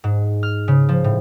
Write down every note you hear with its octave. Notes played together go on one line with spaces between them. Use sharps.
G#2
F6
C#3
F3
A2